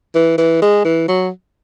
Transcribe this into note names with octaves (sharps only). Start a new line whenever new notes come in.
E3
E3
G#3
E3
F#3